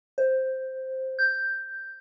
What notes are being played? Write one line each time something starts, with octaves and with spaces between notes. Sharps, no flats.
C5
G6